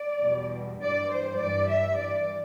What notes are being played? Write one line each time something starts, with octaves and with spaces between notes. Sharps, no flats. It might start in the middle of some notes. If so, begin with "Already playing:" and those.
Already playing: D5
E2 B2 G3
G2 E3 G3 D5
C5
G2 E3 G3 D5
E5
G2 E3 G3 D5